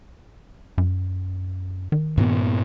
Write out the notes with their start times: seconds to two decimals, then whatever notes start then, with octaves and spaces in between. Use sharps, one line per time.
0.78 F#2
1.92 D#3
2.18 G2 A#2 B3